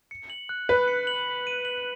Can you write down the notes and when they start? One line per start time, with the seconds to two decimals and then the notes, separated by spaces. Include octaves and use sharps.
0.11 C#7
0.30 F#7
0.49 F#6
0.69 B4 F#6
0.88 C#7
1.07 F#7
1.27 B6
1.47 D#7
1.65 F#7